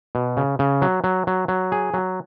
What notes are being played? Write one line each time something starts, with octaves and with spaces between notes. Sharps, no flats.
B2
C#3
C#3
F#3
F#3
F#3
F#3
G#4
F#3